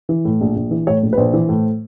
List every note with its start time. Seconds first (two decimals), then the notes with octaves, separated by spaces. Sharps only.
0.09 E3
0.25 A2
0.41 A#1
0.56 A#1
0.71 E3
0.87 A2 C#5
1.02 A#1
1.13 B4
1.17 A#1 C5
1.33 E3
1.49 A2